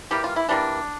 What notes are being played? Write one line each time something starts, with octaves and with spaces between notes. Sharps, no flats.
E3 G3 A#3 G4
F4
E4
E3 G3 A#3 D4